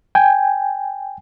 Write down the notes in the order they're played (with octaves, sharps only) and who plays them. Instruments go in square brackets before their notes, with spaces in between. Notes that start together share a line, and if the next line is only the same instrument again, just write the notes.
[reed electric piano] G5 G#5